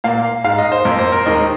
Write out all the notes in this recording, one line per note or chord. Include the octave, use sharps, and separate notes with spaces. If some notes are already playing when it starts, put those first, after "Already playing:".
A#2 A#3 F5
G#2 G#3 F5
D#5
C5
F2 F3 A#3 A#4
C5
A#4
D#2 D#3 G#3 D#5